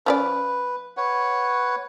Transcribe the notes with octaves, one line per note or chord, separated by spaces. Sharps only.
F3 C#4 B4 D5
B4 C#5 F#5